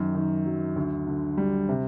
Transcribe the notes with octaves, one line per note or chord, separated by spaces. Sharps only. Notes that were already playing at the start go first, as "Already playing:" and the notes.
Already playing: F#2 D#3
D#3
F#3
D2
D3
G3
C3